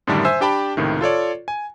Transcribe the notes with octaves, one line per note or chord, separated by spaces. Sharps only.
F#2 A2 D3 D#3 G3 D4
C5 E5 G#5 E6
D4 G4 G5 A5 B5
C#2 A2 C3 D#3
F4 A4 C#5 D5
G#5